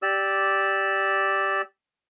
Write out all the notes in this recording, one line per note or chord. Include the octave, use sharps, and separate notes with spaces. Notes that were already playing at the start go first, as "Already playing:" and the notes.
G4 D5 E6